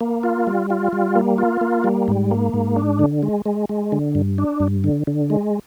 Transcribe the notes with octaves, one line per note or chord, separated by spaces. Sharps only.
A#3
F4
G3
F4
G3
A#3
F4
A#3
G3
G#2
A#3
G#2
D4
D3
G#3
G#3
G#3
D3
G2
D4
G2
D3
D3
G#3